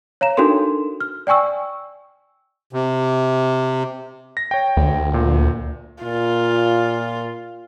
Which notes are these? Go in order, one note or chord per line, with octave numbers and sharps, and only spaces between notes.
C#5 F5 A#5 E7
D4 D#4 F#4 A4 A#4 C6
F6
D5 G5 G#5 C#6 E6
C3
A#6
C#5 G5
D2
A#2
A#2 F4